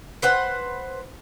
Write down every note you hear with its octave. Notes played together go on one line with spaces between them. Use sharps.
B4 C5 F#5